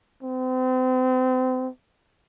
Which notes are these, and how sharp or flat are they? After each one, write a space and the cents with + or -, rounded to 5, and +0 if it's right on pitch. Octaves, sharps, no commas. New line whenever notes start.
C4 -35